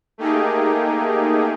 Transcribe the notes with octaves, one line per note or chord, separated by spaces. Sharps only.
A3 A#3 D#4 G4 G#4